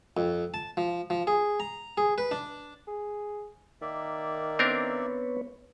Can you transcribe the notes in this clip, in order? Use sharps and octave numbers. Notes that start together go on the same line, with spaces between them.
F2
A5
F3
F3
G#4
A#5
G#4
B4
D4
G#4
D#3 A#3 D5 E5
B3 C4 D4 A#4 B4 C#5